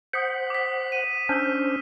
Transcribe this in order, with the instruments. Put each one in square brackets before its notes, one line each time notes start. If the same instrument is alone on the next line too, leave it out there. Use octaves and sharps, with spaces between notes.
[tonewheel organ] C5 F#5 [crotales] D#6 B6
[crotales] D6 B6
D#7
[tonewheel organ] C#4 D4 C5 [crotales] E6 F6